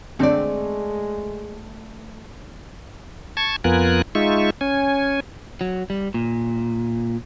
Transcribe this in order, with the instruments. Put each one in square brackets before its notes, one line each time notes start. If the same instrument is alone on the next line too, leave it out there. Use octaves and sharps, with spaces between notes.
[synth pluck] D3 C4 D4 [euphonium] G#3 [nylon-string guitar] A3 D5
[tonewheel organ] A5 C#6 G#6
F2 B3 F4 A#4 G#5 F#6
G#3 D#4 F4 E5 C#6
C#4 G#5
[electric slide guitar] F#3
G3
A#2